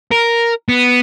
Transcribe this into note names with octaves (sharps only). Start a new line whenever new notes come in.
A#4
B3